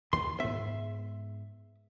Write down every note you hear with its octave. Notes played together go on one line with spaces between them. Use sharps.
D#2 D#3 C6
G#2 B3 E5